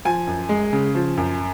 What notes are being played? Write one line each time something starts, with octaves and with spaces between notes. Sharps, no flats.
F3 G#5
F#2
G#3
C#3
F3
F#2